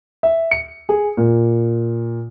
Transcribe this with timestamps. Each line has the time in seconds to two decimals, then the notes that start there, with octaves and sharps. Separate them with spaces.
0.23 E5
0.51 C#7
0.89 G#4
1.17 A#2